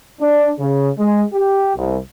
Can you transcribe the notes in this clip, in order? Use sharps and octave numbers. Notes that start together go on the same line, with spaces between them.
D4
C#3
G#3
G4
C2